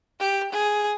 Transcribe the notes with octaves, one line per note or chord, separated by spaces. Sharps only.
G4
G#4